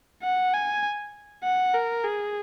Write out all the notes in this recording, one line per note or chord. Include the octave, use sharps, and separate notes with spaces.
F#5
G#5
F#5
A#4
G#4